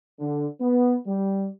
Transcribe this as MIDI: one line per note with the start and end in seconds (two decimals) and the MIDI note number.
0.19 0.46 50
0.59 0.97 59
1.06 1.47 55